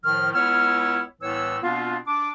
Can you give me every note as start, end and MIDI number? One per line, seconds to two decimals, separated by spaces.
0.05 0.32 45
0.05 0.32 51
0.05 0.32 53
0.05 0.32 89
0.34 1.02 37
0.34 1.02 59
0.34 1.02 64
0.34 1.02 73
0.34 1.02 88
0.34 1.02 89
1.22 1.57 36
1.22 1.57 45
1.22 1.57 52
1.22 1.57 59
1.22 1.57 73
1.22 1.57 88
1.63 1.97 47
1.63 1.97 59
1.63 1.97 60
1.63 1.97 62
1.63 1.97 65
2.07 2.31 62
2.07 2.31 86